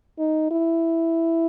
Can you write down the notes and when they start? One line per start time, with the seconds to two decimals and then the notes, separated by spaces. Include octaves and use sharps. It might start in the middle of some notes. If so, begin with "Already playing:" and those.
0.19 D#4
0.51 E4